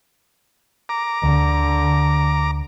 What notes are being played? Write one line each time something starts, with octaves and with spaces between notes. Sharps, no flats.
A#5 D6
D2 D3